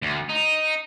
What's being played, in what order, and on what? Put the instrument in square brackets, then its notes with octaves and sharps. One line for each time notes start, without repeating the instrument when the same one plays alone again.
[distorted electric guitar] D2
D#4